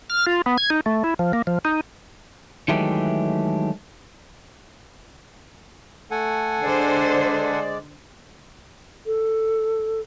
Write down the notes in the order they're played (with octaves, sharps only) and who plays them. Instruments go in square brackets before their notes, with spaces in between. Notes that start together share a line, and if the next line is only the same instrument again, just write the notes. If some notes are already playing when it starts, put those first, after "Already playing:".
[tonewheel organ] F6
F4
B3
G#6
D#4
A3
E4
F3
A#3
F3
D#4
[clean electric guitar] D#3 E3 F#3 G#3 A3 G4
[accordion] A3 [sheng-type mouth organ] A4 F#5 G#5
[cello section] D3 C5 [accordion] G#3 D5
[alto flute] A4